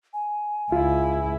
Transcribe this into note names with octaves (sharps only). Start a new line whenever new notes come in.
G#5
C#2 E4 F4